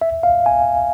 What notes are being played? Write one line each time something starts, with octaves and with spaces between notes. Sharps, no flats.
E5
F5
G#5